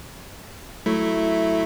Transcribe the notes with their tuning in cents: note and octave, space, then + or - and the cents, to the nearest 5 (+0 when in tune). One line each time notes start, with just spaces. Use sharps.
F#3 +0 A3 -5 E4 +0